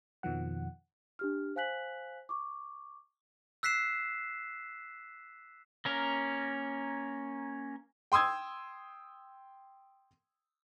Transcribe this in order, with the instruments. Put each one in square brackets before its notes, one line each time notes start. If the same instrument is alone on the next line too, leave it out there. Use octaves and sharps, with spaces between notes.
[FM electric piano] F2 B2 D#3 F3 F#5
[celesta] D4 G4 F6
C5 F5 G#5 F#6 B6 F#7
C#6 D6
[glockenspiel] E6 F#6 B6 C7 E7
[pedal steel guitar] A#3 C#4 A#4
[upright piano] G5 C6 D#6 E6 G#6